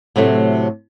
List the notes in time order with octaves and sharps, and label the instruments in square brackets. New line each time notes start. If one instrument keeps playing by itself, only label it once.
[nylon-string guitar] A2 C3 F#3 A3